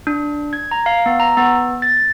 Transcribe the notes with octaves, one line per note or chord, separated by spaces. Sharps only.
D4
G#6
A#5
F5
B3
A#5
B3
A6